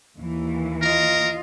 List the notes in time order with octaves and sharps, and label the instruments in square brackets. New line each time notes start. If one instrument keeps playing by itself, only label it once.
[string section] D#2 E3
[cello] F4 D#5 [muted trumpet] A#4